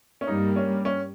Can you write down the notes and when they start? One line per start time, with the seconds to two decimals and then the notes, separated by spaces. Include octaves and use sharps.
0.21 C#4
0.27 G2 G3 A#3 D#4
0.56 C#4
0.85 C#4